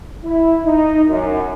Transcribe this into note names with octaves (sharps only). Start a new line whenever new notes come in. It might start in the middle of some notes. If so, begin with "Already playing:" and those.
E4
D#4
F#2